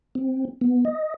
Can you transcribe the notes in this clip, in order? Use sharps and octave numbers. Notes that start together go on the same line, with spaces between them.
C4
B3
D#5